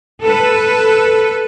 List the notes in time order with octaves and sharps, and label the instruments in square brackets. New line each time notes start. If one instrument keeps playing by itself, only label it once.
[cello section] A4 B4